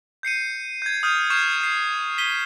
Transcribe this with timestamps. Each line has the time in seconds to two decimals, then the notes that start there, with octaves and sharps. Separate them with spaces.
0.23 G6 C7 C#7 D#7
0.82 G6 G#6
1.03 D#6 F6 G6 D#7 F7
1.30 C#6 F6 G6 G#6 C7 E7
1.61 G6 C7
2.18 B6 D#7 G7